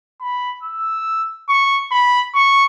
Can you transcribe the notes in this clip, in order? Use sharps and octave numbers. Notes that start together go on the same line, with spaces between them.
B5
E6
C#6
B5
C#6